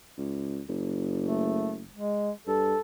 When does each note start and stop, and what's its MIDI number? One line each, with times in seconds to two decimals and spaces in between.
0.18 0.62 37
0.68 1.92 30
1.22 1.81 57
1.93 2.31 56
2.47 2.75 43
2.47 2.79 69